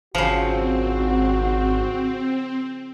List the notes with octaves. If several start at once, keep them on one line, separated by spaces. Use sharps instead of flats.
G#1 C#3 F3 C4 F#4